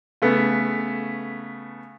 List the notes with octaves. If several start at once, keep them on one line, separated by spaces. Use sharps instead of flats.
C#3 A3 B3